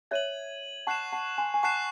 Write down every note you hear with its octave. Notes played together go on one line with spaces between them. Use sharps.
C#5 E5 G#6 D#7 F#7
F#5 A5 C#6 F#6 C7 E7
F#5 A5
G#5 C6
G#5
F#5 A5 C#6 F#6 C7 E7